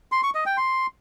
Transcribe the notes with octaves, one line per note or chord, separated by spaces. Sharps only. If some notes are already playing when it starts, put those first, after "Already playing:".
C6
C#6
D#5
G5
C6